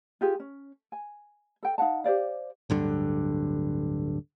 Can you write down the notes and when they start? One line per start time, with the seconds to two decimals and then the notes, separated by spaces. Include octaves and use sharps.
0.21 F4 G4 G#4
0.40 C#4
0.92 G#5
1.63 A4 G5
1.78 D#4 F5 F#5 A5
2.04 G4 C5 D5 F5
2.70 D1 G2 D3